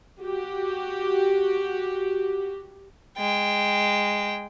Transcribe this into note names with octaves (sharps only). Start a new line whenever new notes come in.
F#4 G4
G#3 G5